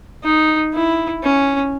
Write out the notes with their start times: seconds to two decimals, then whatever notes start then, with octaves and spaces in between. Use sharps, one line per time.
0.23 D#4
0.74 E4
1.24 C#4